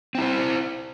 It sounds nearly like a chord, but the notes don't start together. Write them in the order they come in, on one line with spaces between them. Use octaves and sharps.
C4 E4 C5